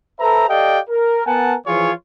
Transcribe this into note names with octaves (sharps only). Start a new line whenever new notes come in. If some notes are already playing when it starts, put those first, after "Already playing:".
A4 B4 C5 E5 A#5
G4 A4 D5 D#5 F5 G5
A#4
B3 A#4 F#5 G#5 A5
E3 F3 F4 G#4 C#5